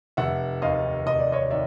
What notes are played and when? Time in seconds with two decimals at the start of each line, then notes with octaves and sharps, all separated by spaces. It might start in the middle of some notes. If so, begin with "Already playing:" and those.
0.17 F1 E5 F#5
0.62 D#2 D#3 D#5 F5
1.06 F1 D#5
1.19 D5
1.32 C#5 D#5
1.51 D#3 D5 E5